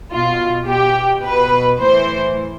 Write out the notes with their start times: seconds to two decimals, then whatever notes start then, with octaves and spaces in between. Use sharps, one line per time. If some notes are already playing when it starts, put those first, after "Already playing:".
0.12 B2 F4
0.67 B2 G4
1.24 B2 B4
1.79 A2 E3 C5